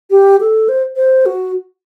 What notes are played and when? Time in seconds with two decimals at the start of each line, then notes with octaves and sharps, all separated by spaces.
0.11 G4
0.40 A4
0.69 C5
0.96 C5
1.26 F#4